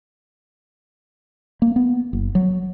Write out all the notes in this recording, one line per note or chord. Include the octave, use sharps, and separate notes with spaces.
A#3
B3
F#1
F#3